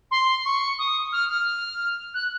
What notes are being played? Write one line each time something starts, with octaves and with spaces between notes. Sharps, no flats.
C6
C#6
D#6
F6
F6
F#6